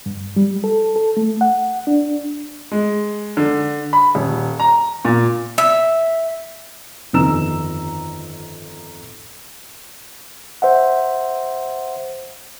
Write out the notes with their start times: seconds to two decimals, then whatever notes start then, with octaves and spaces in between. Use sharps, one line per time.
0.06 G2
0.36 G3
0.64 A4
0.96 A4
1.17 A3
1.41 F#5
1.87 D4
2.72 G#3
3.37 D3
3.93 B5
4.15 D#1
4.60 A#5
5.05 A#2
5.58 E5
7.13 G1 F2 D#3 A#5 E6 E7
10.62 C5 E5 F#5